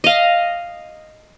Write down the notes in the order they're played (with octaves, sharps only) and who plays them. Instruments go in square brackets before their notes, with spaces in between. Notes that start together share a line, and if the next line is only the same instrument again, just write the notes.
[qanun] D#5 F5